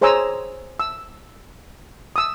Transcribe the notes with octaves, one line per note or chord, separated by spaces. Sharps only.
G#4 C5 C#5 G#5 A#5 E6
E6
D#6 E6